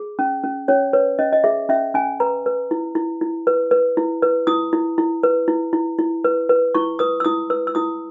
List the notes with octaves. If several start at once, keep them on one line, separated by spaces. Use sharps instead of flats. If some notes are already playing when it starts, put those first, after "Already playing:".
Already playing: G#4
C#4
C#4
C#4 C#5
B4 C#5
C#4 D#5
D#5
G#4 E5
C#4 E5
C#4 G#5
B4 A#5
B4
E4
E4
E4
B4
B4
E4
B4
E4 D#6
E4
E4
B4
E4
E4
E4
B4
B4
E4 C#6
B4 D#6
E6
E4 D#6
B4 E6
E6
E4 D#6